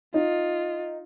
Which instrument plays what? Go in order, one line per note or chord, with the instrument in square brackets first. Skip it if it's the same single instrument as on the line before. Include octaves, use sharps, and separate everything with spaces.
[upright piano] D#4 [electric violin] F4